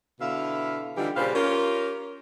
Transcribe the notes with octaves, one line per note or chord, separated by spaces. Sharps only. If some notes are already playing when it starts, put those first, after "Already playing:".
B2 D3 E4 E5 F5
D3 E3 G3 D#4 F4 G4
A#2 C#3 G3 B4 C5 F5
C#4 F4 G4 A#4